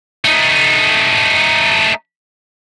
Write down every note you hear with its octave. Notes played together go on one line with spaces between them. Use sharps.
A3 D#4